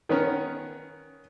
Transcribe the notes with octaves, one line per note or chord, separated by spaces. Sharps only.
D#3 B3 C#4 A#4